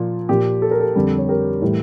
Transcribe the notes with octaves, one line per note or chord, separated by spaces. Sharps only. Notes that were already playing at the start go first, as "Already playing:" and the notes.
Already playing: A#2 F3
A#2 F3 G4
A4
A#4
A4
F2 D3 G3
C#5
G4 A#4
A2 E3 G3